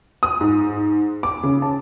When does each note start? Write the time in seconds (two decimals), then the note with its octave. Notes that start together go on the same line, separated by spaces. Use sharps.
0.23 D#6
0.41 G#2
1.23 D6
1.43 C#3
1.62 A5